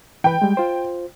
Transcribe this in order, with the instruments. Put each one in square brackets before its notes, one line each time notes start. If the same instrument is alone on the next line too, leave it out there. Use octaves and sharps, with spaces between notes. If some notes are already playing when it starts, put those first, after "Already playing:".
[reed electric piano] E3 B4 [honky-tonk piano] G5
[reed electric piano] G3 G#3
F4 C5